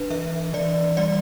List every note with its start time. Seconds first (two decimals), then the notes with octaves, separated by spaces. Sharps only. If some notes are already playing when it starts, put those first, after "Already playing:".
Already playing: D4 B4
0.10 E3 E5
0.53 E3 D5
0.97 G3 D5